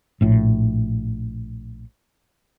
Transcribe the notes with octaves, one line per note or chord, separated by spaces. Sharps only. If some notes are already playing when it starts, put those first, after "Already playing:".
A#1 A2